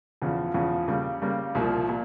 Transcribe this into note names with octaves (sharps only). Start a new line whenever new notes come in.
E2 C#3 F3
E2 C#3 F3
C#3 G3 A#3
C#3 G3 A#3
C2 A#2 F3
A#2